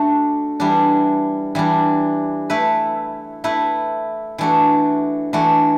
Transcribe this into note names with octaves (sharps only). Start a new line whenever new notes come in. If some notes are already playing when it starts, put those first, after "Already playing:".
Already playing: A3 D4 F#4 A4
E3 G3 D4
E3 G3 D4
A3 E4 B4
A3 E4 B4
E3 A3 D4 F#4
E3 A3 D4 F#4